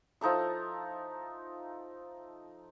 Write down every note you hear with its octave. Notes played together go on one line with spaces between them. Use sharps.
F3 D#4 A4 E5